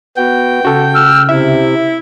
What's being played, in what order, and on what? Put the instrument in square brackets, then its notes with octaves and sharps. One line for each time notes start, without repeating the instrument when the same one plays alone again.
[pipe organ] B3 F#4 [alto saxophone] G5
[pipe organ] C#3 [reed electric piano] F#4 A4
[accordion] E6 F6
[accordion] C3 [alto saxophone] E4 [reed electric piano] E5